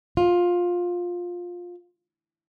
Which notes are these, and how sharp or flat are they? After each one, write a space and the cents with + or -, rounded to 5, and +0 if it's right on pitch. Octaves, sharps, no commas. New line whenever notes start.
F4 +15